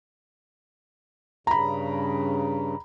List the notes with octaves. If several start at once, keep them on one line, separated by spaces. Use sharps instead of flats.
G2 C#3 A#5 B5